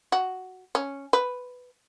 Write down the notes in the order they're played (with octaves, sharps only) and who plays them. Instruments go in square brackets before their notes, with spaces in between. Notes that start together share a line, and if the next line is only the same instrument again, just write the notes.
[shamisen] F#4
C#4
B4